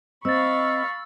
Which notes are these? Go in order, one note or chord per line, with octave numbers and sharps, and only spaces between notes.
C4 D#5 F5 B5 C#6 E6 A6